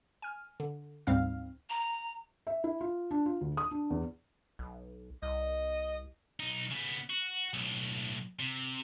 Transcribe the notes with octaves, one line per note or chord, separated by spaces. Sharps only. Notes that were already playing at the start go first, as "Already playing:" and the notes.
G#5 F6
D3
D2 G#2 G3 C4 F5 F6
A#5
E5
E4
F4
D4
F4
D2
D#6
D4
E2
B1
C2 D#5
B1 D#4
C#3 B3
F#4
B1 A2
C3